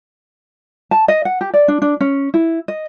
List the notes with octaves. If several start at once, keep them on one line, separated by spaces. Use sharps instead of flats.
A5
D#5
F#5
G4
D5
D4
D4
C#4
E4
D#5